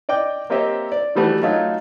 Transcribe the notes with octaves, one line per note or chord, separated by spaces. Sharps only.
D5 D#5 G5 D6
A#3 C4 G4 C#5 D#5 E5
D5
D#3 E3 G3 A3 F#4
F#3 A3 D#4 F4